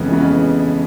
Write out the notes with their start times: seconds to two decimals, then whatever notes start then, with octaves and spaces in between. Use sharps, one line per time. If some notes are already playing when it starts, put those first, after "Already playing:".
Already playing: F2 C#3 E3 G#3 B3
0.12 F2 C#3 E3 G#3 B3